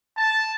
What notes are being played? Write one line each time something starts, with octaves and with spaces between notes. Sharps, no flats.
A5